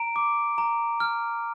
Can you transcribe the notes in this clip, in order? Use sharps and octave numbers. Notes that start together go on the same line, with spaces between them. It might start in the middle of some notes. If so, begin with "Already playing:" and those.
Already playing: A#5 D7
D6
A#5
F6